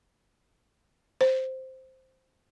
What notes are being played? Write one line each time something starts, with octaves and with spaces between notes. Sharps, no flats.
C5